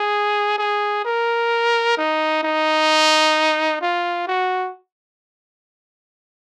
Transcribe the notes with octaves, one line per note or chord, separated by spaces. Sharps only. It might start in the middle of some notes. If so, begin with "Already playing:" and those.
Already playing: G#4
G#4
A#4
D#4
D#4
F4
F#4